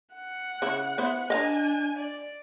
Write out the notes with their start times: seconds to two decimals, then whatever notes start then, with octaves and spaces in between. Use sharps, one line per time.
0.14 F#5
0.62 C#3 E4
0.98 B3 E4 C5
1.30 D4 D#5 F5 G#5 A#5
1.98 D5